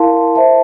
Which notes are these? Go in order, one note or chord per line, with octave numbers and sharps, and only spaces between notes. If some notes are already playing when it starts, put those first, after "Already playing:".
Already playing: E4 A#4 F5 A5 C6
C5 E5 A5